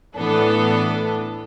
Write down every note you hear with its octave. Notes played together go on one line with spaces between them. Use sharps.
A2 E3 B3 D4 A4